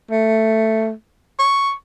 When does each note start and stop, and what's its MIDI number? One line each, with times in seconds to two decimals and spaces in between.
0.11 0.91 57
1.39 1.72 85